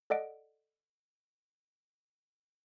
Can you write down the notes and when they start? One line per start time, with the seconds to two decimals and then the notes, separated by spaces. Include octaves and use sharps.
0.10 A4 D5 D#5 F#5 D7